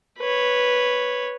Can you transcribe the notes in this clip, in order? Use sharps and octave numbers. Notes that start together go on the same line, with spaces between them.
B4 C#5